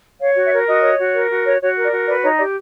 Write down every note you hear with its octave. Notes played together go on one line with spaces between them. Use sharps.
C#5 F5
F#4
E5
A#4
F#4 D#5
C#5
F#4
A#4
F#4
C#5
F#4 C#5
A#4
D5
F#4
B4 D5
D#4 C#5
G4 D5